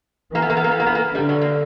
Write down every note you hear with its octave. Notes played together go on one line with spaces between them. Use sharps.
E3 A#3
B3
A#3
B3
A#3
B3
A#3
B3
A#3
D3 G3
F#3
A#3